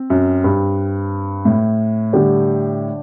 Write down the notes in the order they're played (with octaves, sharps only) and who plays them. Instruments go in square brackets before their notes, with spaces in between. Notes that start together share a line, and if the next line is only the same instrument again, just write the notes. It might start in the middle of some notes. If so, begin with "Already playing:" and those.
Already playing: [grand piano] C4
[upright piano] F#2
G2
A2
[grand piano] D3 G3 D4 G4